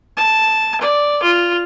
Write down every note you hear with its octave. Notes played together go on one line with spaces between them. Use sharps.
A5
D5
F4